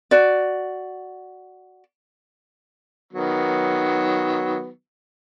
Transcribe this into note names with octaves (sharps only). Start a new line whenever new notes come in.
F#4 D5
D#3 F#3 B3